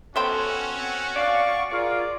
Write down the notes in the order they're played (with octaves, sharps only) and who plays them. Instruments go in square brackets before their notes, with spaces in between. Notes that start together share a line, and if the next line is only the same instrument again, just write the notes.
[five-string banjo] B3 C5 G5 [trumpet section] C#4 F#4 [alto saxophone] A4
[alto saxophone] C4 [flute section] F#5
[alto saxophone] D5 [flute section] F5 F#5 C#6
[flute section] F4 G#4 A#4 [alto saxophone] D5